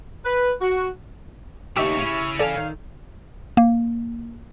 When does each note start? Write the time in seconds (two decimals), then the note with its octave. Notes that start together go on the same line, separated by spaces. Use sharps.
0.25 B4
0.61 F#4
1.76 D#2 C#3 A3 D#4 G4 E5 C#6
1.98 C#3 C#4 E4 F4 G#4
2.39 E3 A4 D5 F5
2.56 D#3
3.57 A#3